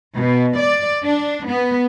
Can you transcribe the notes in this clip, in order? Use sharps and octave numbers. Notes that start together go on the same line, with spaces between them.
B2
D5
D4
B3